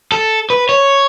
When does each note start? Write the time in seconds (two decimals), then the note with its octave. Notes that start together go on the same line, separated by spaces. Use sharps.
0.12 A4
0.50 B4
0.69 C#5